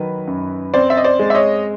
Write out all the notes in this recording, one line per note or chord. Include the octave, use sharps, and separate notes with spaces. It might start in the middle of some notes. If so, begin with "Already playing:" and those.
Already playing: D#3 F#3 B4
F#2
C4 C5 D5
E5
D#5
C5 D5
G#3
E5
C#5 D#5